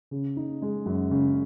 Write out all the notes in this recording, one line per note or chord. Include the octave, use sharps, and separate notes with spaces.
C#3
D#4
G#3
F#2
C#3